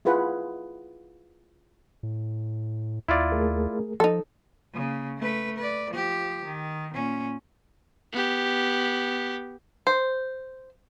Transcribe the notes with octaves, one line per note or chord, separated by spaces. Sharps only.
E4 F4 G#4 B4 F#5
A2
D#2 E4 F4 D5
A3 G#4 A#4
F3 D#4 A4
C#3 A#3
A3 B4
B4 D5
F3 G4
D#3
A#2 C#4
B3 G4
C5